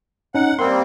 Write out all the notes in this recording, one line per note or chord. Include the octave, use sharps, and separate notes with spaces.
C#4 D#4 F#5
G3 A#3 C4 C6